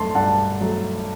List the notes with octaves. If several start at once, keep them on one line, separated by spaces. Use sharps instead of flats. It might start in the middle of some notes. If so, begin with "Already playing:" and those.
Already playing: G2 F#3 A3 A5 C6
G2 F#5 A5
F#3 A3